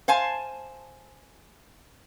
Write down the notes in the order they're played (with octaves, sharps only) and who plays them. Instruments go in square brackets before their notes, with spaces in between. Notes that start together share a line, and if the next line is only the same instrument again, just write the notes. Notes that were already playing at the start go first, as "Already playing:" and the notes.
[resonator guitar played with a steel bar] C5 F5 G#5 A5